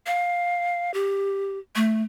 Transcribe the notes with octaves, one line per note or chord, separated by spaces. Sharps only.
F5
G4
A3